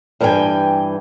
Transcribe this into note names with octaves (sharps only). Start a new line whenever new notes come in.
G2 E3 D#4 A#4 G5 G#5